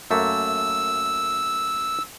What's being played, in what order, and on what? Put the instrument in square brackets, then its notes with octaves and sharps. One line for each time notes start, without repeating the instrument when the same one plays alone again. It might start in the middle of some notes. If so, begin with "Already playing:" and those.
[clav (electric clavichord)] F#2 A3 A#3 [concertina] E6